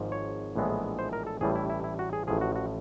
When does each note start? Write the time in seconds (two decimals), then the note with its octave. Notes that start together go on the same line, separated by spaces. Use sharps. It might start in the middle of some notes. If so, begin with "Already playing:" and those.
Already playing: G#1 G#2 F3
0.12 C#5
0.56 A#1 A2 E3 G#3 B3
0.99 C5
1.13 A#4
1.27 A4
1.41 A1 A2 E3 G3 G#4
1.56 E4
1.70 E4
1.84 E4
1.99 F#4
2.13 G#4
2.27 A1 A2 F3 G#4
2.41 F#4
2.56 F#4